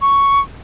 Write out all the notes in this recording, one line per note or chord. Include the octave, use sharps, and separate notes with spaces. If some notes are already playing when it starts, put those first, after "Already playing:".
C#6